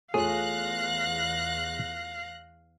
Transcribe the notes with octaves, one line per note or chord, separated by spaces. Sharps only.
E2 A3 F4 G#4 C#5 F5 F#6 A#6